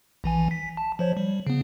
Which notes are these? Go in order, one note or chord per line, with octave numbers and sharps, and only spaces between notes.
A#1 E3 G#5
B6
A5
F3 C5 C#5
G3
C#3 B3